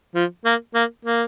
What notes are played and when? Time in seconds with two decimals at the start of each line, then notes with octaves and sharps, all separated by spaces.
0.15 F3
0.45 A#3
0.75 A#3
1.05 A#3